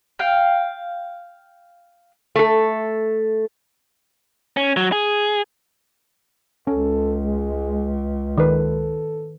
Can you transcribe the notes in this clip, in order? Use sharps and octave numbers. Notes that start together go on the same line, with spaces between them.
F5 G5
A3 A4
C#4
F#3
G#4
C#2 C#4 A4
G#3
D#3 A4 B4